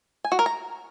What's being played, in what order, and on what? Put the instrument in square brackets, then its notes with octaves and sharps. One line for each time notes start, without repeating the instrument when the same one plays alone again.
[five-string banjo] G#5
F#4
A#4
A#5